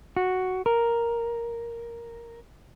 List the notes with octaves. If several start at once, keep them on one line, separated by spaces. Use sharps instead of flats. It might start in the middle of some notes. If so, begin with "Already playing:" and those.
F#4
A#4